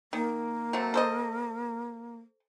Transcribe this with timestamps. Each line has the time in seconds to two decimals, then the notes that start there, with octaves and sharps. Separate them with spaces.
0.13 D#3 A#3
0.73 F#3 A3 C4
0.94 A4 C5 D#5